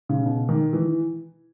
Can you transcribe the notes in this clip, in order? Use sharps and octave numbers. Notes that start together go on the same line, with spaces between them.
C#3
B2
D#3
E3